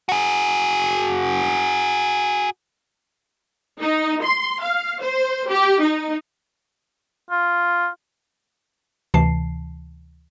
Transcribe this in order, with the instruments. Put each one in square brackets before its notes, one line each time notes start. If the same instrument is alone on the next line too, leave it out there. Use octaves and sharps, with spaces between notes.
[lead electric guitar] F#4 G#4
[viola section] D#4
C6
F5
C5
G4
D#4
[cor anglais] F4
[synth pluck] D2 C3 E3 A5 C7